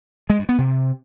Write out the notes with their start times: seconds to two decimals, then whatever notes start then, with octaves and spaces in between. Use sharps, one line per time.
0.30 G#3
0.39 G2
0.49 B3
0.58 C3